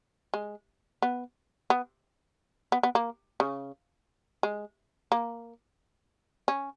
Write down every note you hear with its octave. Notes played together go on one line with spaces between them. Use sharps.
G#3
B3
B3
B3
B3
A#3
C#3
G#3
A#3
C#4